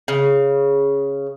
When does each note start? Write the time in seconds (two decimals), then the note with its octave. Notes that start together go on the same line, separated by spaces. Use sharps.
0.08 C#3